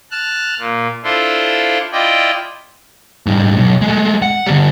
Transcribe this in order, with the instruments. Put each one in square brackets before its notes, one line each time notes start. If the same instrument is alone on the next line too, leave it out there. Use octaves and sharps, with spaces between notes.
[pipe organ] A5 F6 F#6
A#2
D4 E4 F4 A4 C5
E4 F4 D5 D#5 G5
[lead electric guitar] G#2 G3
B1
G#3 A3
F#5
D3 G3